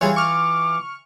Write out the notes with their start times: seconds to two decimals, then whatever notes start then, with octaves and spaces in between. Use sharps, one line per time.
0.01 E3 G3 F4 G#4 C#5
0.16 C#6 D6 F6